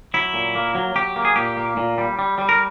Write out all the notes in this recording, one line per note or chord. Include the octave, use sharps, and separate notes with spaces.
F#3 E4
A#2
A#3
F#3
F#3 G4
A#3
G#4
A#2 G4
A#3
A#2
G3
G3
G3
A#4